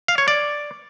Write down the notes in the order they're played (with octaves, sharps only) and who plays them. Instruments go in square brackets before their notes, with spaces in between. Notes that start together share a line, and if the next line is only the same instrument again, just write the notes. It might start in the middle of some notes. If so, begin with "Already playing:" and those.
[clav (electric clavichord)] F5
C#5
D5